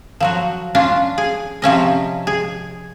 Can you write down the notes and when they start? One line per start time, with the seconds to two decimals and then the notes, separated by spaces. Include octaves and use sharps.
0.20 F3 F#3 F#4
0.75 C#4 D4 F4
1.18 G#4
1.62 C3 F3 C#4 D#5
2.27 G#4